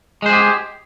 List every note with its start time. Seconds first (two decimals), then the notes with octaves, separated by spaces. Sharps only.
0.22 G#3
0.26 C5
0.29 G#4
0.33 G4